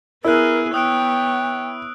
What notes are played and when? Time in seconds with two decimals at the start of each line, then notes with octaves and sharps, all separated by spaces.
0.25 B3 E4 G#4 A#4 E6 F#6
0.74 B3 C#5 G5 D#6 F#6 D7